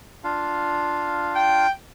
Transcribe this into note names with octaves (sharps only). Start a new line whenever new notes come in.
D4 F4 F5
G5